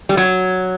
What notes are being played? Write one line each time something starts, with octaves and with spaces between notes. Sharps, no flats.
G3
F#3